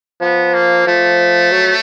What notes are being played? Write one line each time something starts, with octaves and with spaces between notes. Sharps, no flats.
F3 B3
A#3
F3 A3
F#3